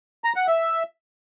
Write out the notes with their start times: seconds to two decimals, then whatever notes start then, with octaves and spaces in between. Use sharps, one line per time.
0.24 A#5
0.36 F#5
0.48 E5